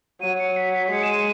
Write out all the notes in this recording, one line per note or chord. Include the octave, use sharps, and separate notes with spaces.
F#3 D#7
C#7
B6
B6
G#3 C#7
E7
D#7